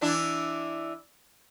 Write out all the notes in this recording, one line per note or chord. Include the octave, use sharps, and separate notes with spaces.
E3 D4 E4